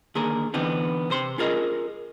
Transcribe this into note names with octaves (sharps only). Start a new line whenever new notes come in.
D3 D#3 A#3 G#4 A#4
D3 E3 B3 C4 D#4
C3 C5 C6
C#4 F4 G#4 A#4 D#5